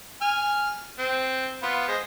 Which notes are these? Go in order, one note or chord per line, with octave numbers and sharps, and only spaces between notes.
G#5 F6
C4
B3 F4
G#3 C5